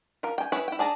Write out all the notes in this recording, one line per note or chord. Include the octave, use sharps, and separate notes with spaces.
F4 A#4
G5 G#5
E4 G#4 B4 C#5
E4 G5
D4 G#4 A5 A#5